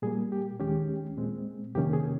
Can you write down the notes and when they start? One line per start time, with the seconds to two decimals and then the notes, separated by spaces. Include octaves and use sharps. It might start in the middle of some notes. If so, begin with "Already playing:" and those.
0.02 A#2 G3 A#3 G#4
0.32 G4
0.60 D#2 D#3 G#3 C#4 G4
1.17 A#2 G#3 C4
1.75 F2 C3 D#3 A#3 C#4 G4
1.93 G#4